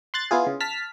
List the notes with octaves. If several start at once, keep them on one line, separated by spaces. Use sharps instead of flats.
C6 F#6 A6
B3 E4 F4 G#4
C#3
A5 F6 B6